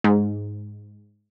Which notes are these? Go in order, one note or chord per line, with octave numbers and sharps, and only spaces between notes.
G#2